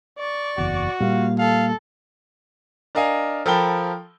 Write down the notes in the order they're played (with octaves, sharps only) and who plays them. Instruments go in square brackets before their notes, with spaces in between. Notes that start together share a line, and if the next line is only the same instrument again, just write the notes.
[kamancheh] D5 C#6
[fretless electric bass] F#1 E2 [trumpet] F#4
[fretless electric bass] A#2 [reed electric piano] G3 A#3 [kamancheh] F5
[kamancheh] A4 [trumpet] F5
[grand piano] D4 A#4 D#5 F5 G#5
F3 A4 A#4 G5 B5 G7